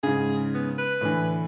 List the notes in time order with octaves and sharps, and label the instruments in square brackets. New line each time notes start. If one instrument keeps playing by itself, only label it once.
[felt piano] G#2 C#3 [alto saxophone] G#4
[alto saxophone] B3
B4
[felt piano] A2 D3 E3